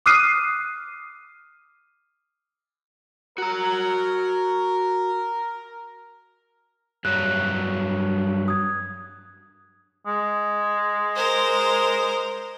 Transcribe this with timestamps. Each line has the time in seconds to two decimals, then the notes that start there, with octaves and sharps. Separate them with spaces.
0.06 D6 D#6 F6 F#6 C7 D#7
3.38 F#4 A#4 A#5
7.05 G2 F#3 F#6
8.48 D#6 G#6
10.07 G#3
11.16 A#4 C5